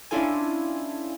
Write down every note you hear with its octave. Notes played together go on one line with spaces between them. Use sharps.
C#4 D4 E4 F4 A4 G#5